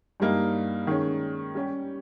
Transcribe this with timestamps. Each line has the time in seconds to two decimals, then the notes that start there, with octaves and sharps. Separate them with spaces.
0.20 G2 G3 A#3 D#4
0.87 D#3 G#3 C#4
1.55 G3 C#4 G4